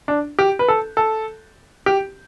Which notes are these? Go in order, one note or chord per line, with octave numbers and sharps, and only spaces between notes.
D4
G4
B4
A4
A4
G4